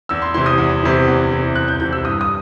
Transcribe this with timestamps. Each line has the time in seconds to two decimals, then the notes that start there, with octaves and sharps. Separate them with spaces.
0.09 E2 E6
0.22 C6
0.34 C3 E3 C6
0.46 D#6
0.58 E2
0.83 C3 E3
1.08 E2
1.32 C3 E3
1.55 E2 F#6
1.68 G6
1.80 C3 E3 G6
1.93 E6
2.05 G2 D#6
2.21 D#6